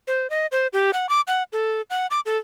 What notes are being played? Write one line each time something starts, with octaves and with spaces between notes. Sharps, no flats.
C5
D#5
C5
G4
F#5
D6
F#5
A4
F#5
D6
A4